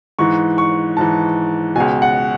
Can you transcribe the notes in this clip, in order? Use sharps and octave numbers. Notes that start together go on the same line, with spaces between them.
G#2 E3 C#6
C#6
G#2 E3 A5
C#2 B2 G#5
F#5